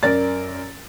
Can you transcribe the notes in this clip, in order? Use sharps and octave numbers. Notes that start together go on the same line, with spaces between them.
F#2 A#4 D5 A6